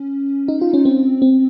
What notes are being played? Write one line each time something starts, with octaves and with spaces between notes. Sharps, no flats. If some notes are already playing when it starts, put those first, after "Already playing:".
Already playing: C#4
D#4
F4
C#4
C4
C4